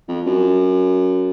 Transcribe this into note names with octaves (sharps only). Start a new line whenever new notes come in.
F2
F#2